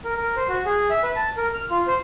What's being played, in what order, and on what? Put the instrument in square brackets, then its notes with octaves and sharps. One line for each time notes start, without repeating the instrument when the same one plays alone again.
[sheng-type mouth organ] A#4
A#4
C5
F#4
G#4
E5
B4
A5
A#4
F6
F4
C5